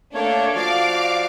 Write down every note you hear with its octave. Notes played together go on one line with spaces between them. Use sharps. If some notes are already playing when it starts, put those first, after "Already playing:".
A3 A#3 D4 A4 C#5
F3 F#4 D5 F5 D6